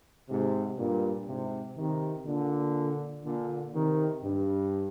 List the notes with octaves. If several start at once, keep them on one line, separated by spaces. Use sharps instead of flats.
G#2 C3
G2 A#2
G#2 C3
C3 D#3
A#2 D3
A#2 D3
C3 D#3
G2